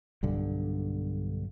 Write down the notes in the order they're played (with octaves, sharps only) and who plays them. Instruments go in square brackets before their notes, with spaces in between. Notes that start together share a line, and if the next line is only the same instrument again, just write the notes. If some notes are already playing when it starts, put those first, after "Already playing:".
[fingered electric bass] B1 G2 D3